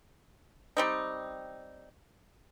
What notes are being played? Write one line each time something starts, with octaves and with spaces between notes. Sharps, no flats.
G3 C4 D#4